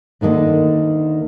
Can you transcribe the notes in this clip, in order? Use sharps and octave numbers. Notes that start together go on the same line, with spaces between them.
D2 D3 D#3 G#3 A#3